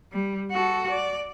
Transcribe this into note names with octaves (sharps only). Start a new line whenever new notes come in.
G3
F#4 A4
D5